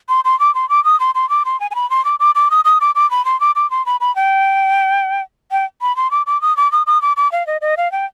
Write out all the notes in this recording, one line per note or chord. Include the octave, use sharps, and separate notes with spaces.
C6
C6
D6
C6
D6
D#6
C6
C6
D6
C6
G#5
G#5
B5
C6
D6
D6
D6
D#6
D#6
D6
D6
B5
C6
D6
D6
C6
B5
B5
G5
G5
B5
C6
D6
D6
D#6
D6
D#6
D#6
D6
D6
F5
D#5
D#5
F5
G5